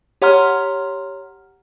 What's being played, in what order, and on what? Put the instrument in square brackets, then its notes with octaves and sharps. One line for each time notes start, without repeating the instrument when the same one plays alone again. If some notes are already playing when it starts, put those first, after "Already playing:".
[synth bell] G4 C#5 F#5 A#5 C6 F6